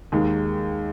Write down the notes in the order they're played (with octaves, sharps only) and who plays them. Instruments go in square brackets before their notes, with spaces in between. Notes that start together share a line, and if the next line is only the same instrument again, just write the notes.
[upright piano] D#2 D#3 G#3